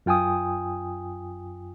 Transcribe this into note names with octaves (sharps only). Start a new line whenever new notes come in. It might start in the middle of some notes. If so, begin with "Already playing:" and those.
F#2 F4 G5 G#5 D#6